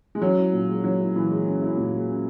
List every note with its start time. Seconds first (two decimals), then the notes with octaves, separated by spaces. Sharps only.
0.15 G#3
0.22 F#3 C#4
0.38 E4
0.53 A#2
0.69 G#3
0.84 F#3 C#4
1.00 E4
1.15 A#2 E3
1.31 G#3
1.46 C#4
1.62 E4
1.77 A#2
1.93 G#3
2.08 C#4